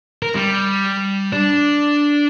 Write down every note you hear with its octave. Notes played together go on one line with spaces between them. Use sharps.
A#4
G3
D4